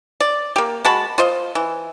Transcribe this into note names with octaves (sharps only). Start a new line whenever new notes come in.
D5
A#3 G4
G#3 F#4 A5 B5
F4 C5 D#5
E3